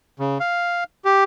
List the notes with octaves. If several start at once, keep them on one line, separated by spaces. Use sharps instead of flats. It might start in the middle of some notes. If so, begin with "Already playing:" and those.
C#3
F5
G4